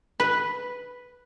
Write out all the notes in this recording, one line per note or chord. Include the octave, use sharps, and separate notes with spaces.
B4